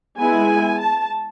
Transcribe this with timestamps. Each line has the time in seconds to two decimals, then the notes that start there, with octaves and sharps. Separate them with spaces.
0.18 G#3 B3 E4 G#5
0.79 A5